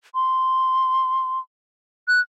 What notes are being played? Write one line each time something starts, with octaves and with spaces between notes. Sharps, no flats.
C6
F#6